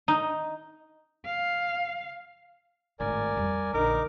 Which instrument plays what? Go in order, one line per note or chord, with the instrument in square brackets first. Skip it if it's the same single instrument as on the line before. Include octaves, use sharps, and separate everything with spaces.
[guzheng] D#4
[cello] F5
[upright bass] G#1 A2 [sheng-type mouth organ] A#4 D5 G#5
[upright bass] F2 G3
[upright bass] A#1 D3 [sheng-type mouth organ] D#4 D6 [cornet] A#4